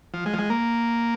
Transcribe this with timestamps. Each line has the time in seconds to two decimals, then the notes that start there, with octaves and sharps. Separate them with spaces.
0.14 F3
0.26 G#3
0.34 F3
0.39 G#3
0.50 A#3